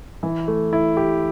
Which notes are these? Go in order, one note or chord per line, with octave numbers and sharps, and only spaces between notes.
E3
A3
E4
G4